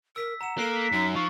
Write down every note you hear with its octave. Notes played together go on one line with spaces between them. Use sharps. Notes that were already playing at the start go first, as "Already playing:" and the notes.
A#4 E6 B6
F#5 A#5 E7
A#3 A4 F#6 C7 E7
B6
F#2 D#4
F3 C#6